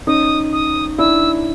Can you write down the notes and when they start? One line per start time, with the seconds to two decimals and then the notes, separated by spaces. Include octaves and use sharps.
0.07 C#4 D#4 D#6
0.53 D#6
0.98 D4 E4 E6